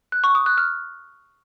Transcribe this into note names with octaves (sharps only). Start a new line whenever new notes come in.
F#6
C#6
D#6
F#6
F6